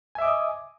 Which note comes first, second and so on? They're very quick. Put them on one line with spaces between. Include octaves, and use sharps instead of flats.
G#5 E5 D6 D#5 D#6